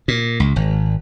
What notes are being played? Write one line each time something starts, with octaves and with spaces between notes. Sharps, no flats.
A#2
C#2
G#1